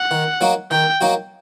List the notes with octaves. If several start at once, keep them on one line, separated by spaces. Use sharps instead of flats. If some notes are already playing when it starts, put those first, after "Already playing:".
Already playing: F#5
D#3
F#3 A#3 D#4 F#4
D#3 G5
F#3 A#3 D#4 F#4